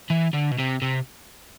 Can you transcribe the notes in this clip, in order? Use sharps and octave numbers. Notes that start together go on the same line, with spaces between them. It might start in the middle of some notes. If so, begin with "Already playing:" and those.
E3
D3
B2
C3
C3